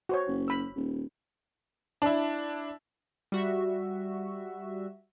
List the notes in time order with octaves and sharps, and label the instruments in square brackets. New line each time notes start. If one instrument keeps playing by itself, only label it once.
[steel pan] F#4 C5 C#5
[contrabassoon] F#1
[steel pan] B5 E6
[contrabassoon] D#1
[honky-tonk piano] D4 E4
[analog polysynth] G3 F#4 E5